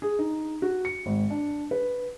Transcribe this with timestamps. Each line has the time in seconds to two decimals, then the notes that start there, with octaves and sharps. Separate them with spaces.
0.02 G#4
0.19 D#4
0.62 F#4
0.85 C#7
1.06 G#1
1.30 D4
1.71 B4